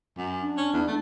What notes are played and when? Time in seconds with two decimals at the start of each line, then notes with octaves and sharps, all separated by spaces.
0.17 F#2
0.41 D4
0.57 C#4
0.73 E2
0.87 A3